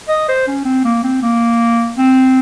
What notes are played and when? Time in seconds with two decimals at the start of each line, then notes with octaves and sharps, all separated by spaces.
0.09 D#5
0.29 C5
0.48 C#4
0.65 C4
0.85 A#3
1.04 C4
1.22 A#3
1.98 C4